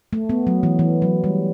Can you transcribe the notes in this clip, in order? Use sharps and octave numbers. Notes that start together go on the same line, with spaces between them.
A3
B3
F#3
E3
E3
F#3
G3